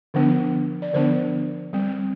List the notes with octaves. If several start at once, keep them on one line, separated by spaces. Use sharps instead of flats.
D3 F3 B3 D4
D5
D3 F3 B3 D4 C5
G3 C4